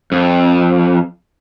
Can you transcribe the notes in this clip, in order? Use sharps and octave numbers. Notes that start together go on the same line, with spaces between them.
F2